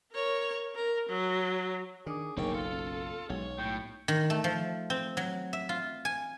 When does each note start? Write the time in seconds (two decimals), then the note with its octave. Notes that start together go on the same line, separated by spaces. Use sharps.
0.12 A#4 C#5
0.75 A#4
1.09 F#3
2.06 D#3 D4 G#4 D6
2.37 F#1 B1 A#3 C#4 D#4 G#4 A#4 G5
2.54 F4 A4
2.72 C#4
3.30 B1 F#3 G#3 C#5
3.58 A2 G5
4.08 D#3
4.30 A3
4.44 F3
4.90 C4
5.17 F#3
5.53 E5
5.69 F4
6.05 G#5